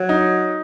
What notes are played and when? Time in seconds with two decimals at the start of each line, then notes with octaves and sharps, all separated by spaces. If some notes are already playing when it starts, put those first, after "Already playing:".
Already playing: F#3
0.09 D#4